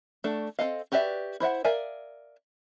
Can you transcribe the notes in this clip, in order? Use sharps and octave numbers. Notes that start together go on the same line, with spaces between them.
A3 D4 F#4 A4
C4 D#4 A4 D#5 F5
F#4 G4 B4 D5 E5
E4 C5 E5 F#5
A#4 D5 E5 F5 G#5